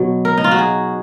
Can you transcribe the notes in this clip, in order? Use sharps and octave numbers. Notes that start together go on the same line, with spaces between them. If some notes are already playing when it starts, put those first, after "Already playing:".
Already playing: B2 F#3
A#4
D#4
F4
F#4
G#4